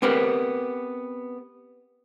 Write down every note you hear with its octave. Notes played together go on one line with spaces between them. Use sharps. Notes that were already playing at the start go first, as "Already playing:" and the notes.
B3 C4 G4 A#4 B4